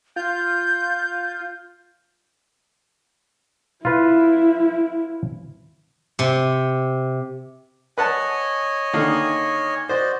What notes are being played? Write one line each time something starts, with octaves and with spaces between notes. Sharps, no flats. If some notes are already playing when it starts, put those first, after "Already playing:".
F4 G6
E4 F4 B4
C3
B4 C#5 D#5 F#5 G#5 A5
D3 D#3 A#3
F#4 C5 D5 D#5